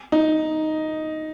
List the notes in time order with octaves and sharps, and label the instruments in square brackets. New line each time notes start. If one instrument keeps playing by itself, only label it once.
[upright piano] D#4